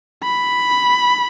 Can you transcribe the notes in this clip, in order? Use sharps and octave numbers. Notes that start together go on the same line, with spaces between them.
B5